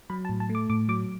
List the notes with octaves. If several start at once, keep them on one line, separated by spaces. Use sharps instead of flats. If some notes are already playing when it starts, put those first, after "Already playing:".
F#3 B5
A5
A2
A5
A3
D6
A2 D6
F#3 D6